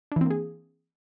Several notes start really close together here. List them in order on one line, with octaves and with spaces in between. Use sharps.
D4 E3 C4 A#3 G#4